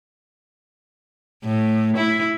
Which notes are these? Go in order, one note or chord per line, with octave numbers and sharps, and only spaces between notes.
A2
E4